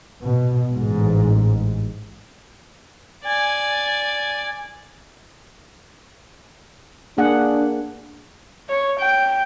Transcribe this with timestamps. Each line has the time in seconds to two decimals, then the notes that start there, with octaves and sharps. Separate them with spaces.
0.24 B2
0.73 A1 G#2
3.25 D5 G#5
7.18 A#3 D4 G#4 F#5
8.70 C#5
9.00 G5